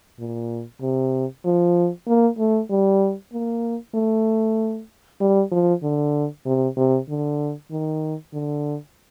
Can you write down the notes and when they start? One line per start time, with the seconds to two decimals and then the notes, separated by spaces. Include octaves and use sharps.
0.19 A#2
0.81 C3
1.45 F3
2.07 A#3
2.38 A3
2.70 G3
3.33 A#3
3.95 A3
5.21 G3
5.52 F3
5.83 D3
6.46 C3
6.77 C3
7.09 D3
7.71 D#3
8.33 D3